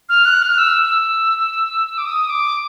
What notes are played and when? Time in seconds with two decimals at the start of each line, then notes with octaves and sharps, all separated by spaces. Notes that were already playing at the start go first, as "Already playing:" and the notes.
0.09 F6
0.25 F#6
0.42 F6
0.58 E6
0.83 E6
1.98 D6
2.05 D#6
2.29 D6